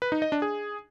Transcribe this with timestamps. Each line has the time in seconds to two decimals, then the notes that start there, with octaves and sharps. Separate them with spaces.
0.02 B4
0.12 D#4
0.22 D#5
0.32 D4
0.42 G#4